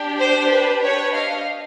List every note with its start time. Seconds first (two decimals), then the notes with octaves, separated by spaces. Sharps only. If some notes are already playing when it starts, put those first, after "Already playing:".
Already playing: D4 G4
0.20 C5
0.52 B4
0.84 B4 C#5
1.15 D#5 F5